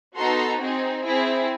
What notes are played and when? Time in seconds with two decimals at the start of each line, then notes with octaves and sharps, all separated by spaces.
0.17 B3 D#4 F#4 A4 A#5 C6
0.60 C4 D#4 G#4
1.03 C4 E4 G#4